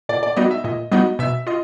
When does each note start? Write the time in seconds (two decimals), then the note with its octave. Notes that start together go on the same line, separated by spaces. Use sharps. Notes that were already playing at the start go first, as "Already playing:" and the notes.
0.09 A#2 D5
0.23 D5
0.37 G3 B3 D#4 F#4 D#5
0.51 E5
0.64 A#2 D#5
0.92 G3 B3 D#4 F#4 D#5
1.19 B2 E5
1.47 F4 D#5